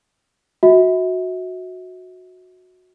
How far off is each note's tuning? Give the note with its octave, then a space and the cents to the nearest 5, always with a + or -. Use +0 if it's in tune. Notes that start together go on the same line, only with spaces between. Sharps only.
F#4 -15 E5 -40